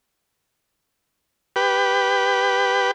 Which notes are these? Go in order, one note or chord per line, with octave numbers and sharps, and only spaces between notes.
G4 B4